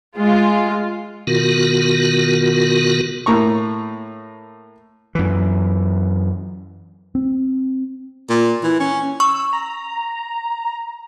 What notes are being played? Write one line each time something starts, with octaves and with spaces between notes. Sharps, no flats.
G#3 F4
B2 D#3 B3 F4 F#4 A#4
A2 A#3 A#5 C#6
F#2 E3
C4
A#2
E3
C#4
C#6 E6
A#5